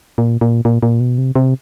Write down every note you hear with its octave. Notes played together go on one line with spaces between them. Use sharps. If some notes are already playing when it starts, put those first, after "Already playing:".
A#2
A#2
A#2
A#2
B2
C3
C3